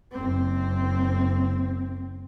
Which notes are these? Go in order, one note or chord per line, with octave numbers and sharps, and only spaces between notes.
F#1 C4